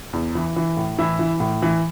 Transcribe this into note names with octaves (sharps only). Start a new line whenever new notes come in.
E2
E3
E3
A2
E3 E4
E3
A2
E3